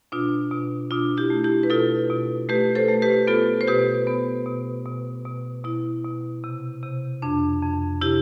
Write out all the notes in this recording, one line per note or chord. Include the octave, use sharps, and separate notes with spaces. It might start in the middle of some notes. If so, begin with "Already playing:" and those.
B2 D4 F4
B2
B2 D4 F4
E4 G4
A3
E4 G4
B4
B2 F4 A4
B2
A3 G4 B4
A4 C5
A3
G4 B4
B3 F4 A4
C5
B2 G4 B4
B3
B2
B2
B2
B2 E4
B2
C3
C3
F2 D4
F2
C3 E4 G4